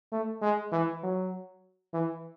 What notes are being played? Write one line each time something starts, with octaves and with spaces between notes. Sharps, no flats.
A3
G#3
E3
F#3
E3